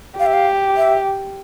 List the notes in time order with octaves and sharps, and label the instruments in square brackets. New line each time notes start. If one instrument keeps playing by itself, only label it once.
[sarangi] G4 [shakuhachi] F5
[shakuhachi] E5
F5
E5